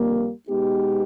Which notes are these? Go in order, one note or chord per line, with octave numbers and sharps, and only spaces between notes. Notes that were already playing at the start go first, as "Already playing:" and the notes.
Already playing: F2 D3 G3 A#3
B2 G#3 B3 D#4 G4